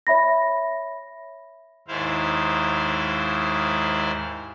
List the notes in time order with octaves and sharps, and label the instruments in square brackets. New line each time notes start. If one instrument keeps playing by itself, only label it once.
[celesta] C#5 E5 B5 A#6
[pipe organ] D#2 G#2 E4 C5 F5